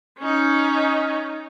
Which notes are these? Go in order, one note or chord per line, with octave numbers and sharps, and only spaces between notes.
C#4 D#4